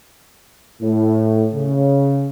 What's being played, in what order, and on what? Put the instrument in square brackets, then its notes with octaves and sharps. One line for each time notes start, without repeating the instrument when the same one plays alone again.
[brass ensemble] A2
C#3